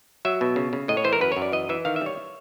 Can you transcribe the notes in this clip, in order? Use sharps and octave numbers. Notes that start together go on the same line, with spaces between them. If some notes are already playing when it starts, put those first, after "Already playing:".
F#3 E5
B2
C#3
C#3
A2 D#5
C#5
E3 C5
A#4
F#2 B4
C#5
F#2
D5
E3 D#5
E3 E5
D#3 F5
E5
G3 C#5